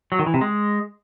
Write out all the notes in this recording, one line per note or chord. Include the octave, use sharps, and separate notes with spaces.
F#3
D#3
E3
C3
G#3